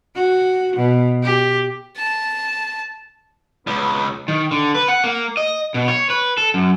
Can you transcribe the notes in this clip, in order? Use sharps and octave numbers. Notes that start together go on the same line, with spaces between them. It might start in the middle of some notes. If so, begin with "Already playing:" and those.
F#4
B2
G4
A5
C#2 B3 C#5
D#3
D3
B4
F#5
A#3
D#5
B2
C#5
B4
A4
F#2